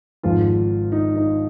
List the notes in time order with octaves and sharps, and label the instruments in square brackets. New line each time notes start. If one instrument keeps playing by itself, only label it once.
[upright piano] G#1 G#2 F3 F4
D#4
D#4